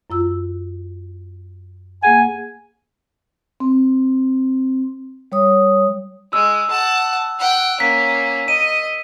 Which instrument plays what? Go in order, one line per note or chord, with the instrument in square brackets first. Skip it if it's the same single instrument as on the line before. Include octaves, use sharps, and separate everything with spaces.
[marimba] F#2 F4 E6
[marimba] A#3 G#4 F#5 [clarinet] G#5
[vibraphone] C4
G3 C#5 D#6
[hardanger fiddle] G#3 [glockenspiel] E6
[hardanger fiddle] F#5 A5
F#5 G5
[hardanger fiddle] A#3 C#4 [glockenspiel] B6
[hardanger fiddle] D#5 [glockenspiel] D#7